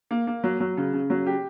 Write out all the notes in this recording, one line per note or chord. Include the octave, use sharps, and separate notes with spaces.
A#3
A#3
F#3
F#3
C#3
C#3
F#3
G4